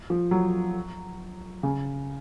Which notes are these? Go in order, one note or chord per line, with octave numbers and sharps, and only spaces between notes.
F3
F#3
C#3